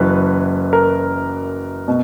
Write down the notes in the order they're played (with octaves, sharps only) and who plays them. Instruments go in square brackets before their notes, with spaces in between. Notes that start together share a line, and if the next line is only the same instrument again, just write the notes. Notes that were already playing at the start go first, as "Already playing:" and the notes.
Already playing: [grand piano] F#1 F#2 E3 B4
A#4
B2